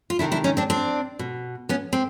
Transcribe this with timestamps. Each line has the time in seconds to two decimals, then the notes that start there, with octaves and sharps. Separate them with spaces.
0.10 F4
0.19 C3 D#3 D4 E4
0.32 D4 E4
0.44 C#4 D#4
0.57 C4 D4
0.70 C4 D4
1.19 B2
1.69 B3 C#4
1.93 C4